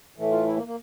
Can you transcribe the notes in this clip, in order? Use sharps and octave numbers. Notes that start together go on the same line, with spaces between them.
A2 E3 A3
F4
E4
A#3
A#3